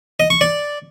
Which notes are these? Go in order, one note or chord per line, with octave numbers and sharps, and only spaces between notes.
D#5
C#6
D5